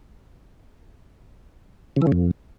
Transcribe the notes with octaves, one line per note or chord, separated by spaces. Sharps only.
C#3
E3
C#3
F2